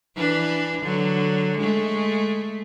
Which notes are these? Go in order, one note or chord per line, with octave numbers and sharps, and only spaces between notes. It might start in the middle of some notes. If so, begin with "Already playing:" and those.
E3 D4 B4
D3 F#3
G#3 A3